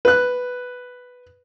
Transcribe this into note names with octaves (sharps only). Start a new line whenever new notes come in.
B4 F#6